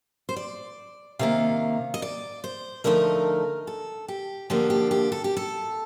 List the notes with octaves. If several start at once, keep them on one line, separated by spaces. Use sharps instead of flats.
C5
D5
C3 D#3 A#3 F5
D#5
D5
C5
D3 F3 A3 D#4 A#4
A4
G4
D3 F3 A#3 D4 G4
G4
G4
A4
G4
A4